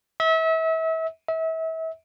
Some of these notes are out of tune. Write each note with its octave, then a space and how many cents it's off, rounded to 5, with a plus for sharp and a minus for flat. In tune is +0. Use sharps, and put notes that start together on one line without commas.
E5 -35
E5 -35